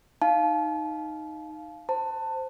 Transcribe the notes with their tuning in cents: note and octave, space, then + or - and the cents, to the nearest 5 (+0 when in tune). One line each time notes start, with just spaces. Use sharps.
D#4 +0 F5 +0 A5 -40
C5 +0 A5 +20